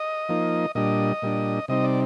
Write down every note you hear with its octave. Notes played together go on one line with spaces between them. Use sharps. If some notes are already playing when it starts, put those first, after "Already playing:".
Already playing: D#5
F3 A#3 D#4
A#2 G3 D4 D#5
A#2 G3 D4
C3 G3 C4 D#4 D#5
D5